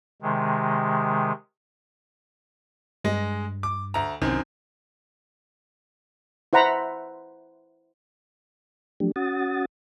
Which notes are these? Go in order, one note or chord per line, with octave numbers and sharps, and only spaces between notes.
C3 D#3 G#3
G2 G#3 D#5
D6
D2 A#5
C2 F#2 D#3 C4
E4 C5 F#5 A#5 B5
F3 F#3 A3 D4 G4
C#4 F#4 F#5 D#6 A6